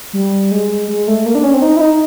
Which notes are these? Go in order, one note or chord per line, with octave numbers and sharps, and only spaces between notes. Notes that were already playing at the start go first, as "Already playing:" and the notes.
G3
G#3
G#3
A3
A#3
D4
C#4
C4
D#4
E4
D#4